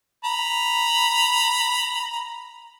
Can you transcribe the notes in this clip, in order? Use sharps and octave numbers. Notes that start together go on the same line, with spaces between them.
A#5 B5